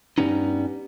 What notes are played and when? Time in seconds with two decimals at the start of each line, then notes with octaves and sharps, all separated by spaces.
0.18 G2 F#3 G3 B3 C#4 D#4